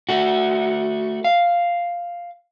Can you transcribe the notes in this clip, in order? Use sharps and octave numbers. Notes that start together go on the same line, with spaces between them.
A3 F#4
F5